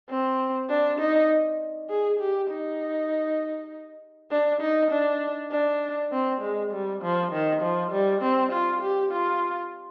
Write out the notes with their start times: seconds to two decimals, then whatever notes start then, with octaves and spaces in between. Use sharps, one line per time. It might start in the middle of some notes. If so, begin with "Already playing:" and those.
0.10 C4
0.70 D4
1.00 D#4
1.90 G#4
2.20 G4
2.51 D#4
4.31 D4
4.62 D#4
4.91 D4
5.51 D4
6.11 C4
6.41 G#3
6.72 G3
7.02 F3
7.32 D#3
7.62 F3
7.92 G3
8.22 C4
8.52 F4
8.82 G4
9.12 F4